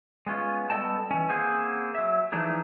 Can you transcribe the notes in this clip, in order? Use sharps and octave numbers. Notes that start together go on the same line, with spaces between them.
G#3 B3 C#4 F4
G3 B3 A4 D#5 G5 A5
E3 C#4
A#3 C4 G#4 C5 F#5 G#5
F#3 E5
E3 F3 A3 D4 D#4 G#4